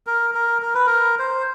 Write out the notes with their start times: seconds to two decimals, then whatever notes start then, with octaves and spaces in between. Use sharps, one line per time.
0.07 A#4
0.35 A#4
0.62 A#4
0.75 B4
0.86 A#4
1.19 C5